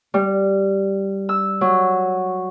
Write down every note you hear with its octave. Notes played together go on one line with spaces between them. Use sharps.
G3
E6
F#3